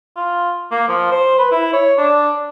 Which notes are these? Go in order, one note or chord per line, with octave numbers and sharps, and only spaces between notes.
F4
A#3
F3
C5
B4
E4
C#5
D4